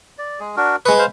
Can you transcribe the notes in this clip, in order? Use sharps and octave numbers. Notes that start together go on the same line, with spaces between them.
D5
G#3 G#4
D4 F#4 A#4
G#3 B4 C#6 D#6
C5 F5